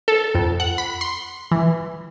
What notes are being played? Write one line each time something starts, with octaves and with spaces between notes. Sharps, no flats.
A4
F2
F#5
B5
C6
E3